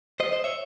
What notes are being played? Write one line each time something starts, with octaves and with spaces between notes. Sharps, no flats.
C5 D#5
C5 D#5
C#5 E5